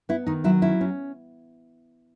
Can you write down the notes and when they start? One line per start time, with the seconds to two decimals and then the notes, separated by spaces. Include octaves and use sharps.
0.09 B3 E4
0.27 D#3 D#4
0.44 F#3 E4
0.62 C#4 E4
0.81 C#4